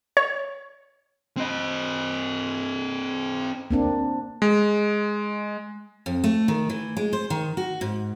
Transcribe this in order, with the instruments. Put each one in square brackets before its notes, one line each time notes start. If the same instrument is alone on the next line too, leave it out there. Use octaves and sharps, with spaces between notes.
[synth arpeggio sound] C#5
[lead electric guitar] C4 D#5
[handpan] A#3 C4 D4
[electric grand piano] G#3
[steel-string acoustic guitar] F2
A3
D#3
E3
G#3
C5
D#3
F#4
G#2